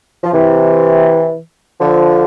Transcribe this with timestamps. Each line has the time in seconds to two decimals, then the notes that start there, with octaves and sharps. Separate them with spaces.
0.24 F3
0.32 C3 E3
1.81 D3 F3